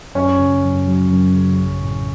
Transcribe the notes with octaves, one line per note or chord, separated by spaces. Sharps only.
F#2 C#4
C#3
F#2
F#3
F#2
C#3
A1
A2